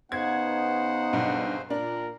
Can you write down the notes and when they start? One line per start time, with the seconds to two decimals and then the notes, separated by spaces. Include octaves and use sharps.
0.12 C#3 B3 D#4 C5 F#5 G#6
1.13 B1 G2
1.70 A#2 D4 A#4